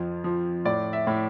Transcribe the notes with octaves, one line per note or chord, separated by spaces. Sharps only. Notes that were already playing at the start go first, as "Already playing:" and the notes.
Already playing: F2 F3
F3
A2 D5
E5
A2